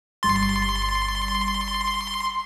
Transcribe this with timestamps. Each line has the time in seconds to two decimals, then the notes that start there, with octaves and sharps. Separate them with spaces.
0.23 G1 G3 C6 A6